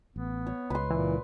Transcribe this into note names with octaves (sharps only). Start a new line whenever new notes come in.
A1 B3
C#5
C#2 B4 C6
A#2 E3